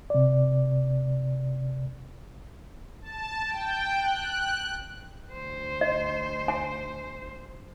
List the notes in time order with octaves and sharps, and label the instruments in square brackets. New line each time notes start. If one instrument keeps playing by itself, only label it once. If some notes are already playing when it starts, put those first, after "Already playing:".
[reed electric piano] C3 D5
[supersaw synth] A5
G5
F#6
[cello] D2 C5
[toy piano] D#5
G#5